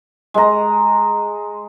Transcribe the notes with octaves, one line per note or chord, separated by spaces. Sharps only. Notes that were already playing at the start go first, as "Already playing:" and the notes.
G#3 A#5